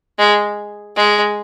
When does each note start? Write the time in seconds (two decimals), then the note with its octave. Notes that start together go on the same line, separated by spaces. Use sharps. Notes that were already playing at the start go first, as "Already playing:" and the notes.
0.19 G#3
0.96 G#3